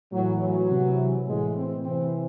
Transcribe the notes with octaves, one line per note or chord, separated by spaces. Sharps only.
A2 E3 F#3
F#3
C3 E3
A2 E3 G#3
C4
C3 E3 C4